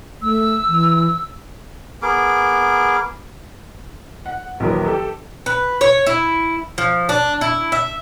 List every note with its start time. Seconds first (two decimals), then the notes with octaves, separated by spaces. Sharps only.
0.22 A3 E6
0.67 E3
2.02 B3 G#4 A#4 D6
4.26 F#5
4.60 A#1 D#2 E3 F#3 A#4 B4
4.86 G4 A4
5.46 B4
5.81 C#5
6.06 E4
6.78 F3
7.09 D4
7.41 E4
7.72 E5